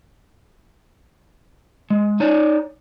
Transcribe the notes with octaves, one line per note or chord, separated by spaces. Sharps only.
G#3
D#4 C#5 D5